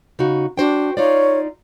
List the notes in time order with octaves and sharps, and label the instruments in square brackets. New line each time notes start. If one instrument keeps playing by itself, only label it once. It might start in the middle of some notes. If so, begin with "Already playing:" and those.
[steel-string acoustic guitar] C#3 D#4 F#4
[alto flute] D4 [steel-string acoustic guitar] F#4 C5 G5
[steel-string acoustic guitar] D#4 F4 D5 [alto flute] C#5